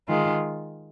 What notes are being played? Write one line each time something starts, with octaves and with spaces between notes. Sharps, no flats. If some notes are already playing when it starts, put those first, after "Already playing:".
D#3 G#3 F4